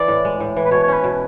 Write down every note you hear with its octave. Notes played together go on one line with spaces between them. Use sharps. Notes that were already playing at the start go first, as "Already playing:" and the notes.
Already playing: E3 D5
A2
G#3
A2
E3
B4
B2 C#5
C#5
C#4 B4
B2